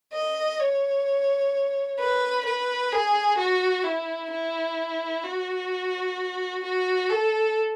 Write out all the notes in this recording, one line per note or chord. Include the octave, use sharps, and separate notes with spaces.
D#5
C#5
B4
B4
G#4
F#4
E4
E4
F#4
F#4
A4